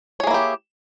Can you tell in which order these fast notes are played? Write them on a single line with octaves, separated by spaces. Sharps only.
C#5 G#4 A#3 E4 G4